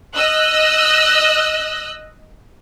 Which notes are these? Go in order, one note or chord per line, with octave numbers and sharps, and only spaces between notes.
D#5 E6 F#6